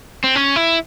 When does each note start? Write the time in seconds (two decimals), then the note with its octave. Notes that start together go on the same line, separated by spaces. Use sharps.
0.24 C4
0.35 C#4
0.56 E4